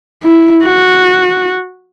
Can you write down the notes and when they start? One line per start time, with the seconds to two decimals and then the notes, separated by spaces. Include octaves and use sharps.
0.23 E4
0.64 F#4